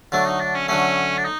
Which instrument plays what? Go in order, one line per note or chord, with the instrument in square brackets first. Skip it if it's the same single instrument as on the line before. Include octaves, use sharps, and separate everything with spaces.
[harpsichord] D3 F#3 A3 [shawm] D4
[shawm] D#4
D4
C#4
[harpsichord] D3 F#3 A3 [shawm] C#4
[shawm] D4
D#4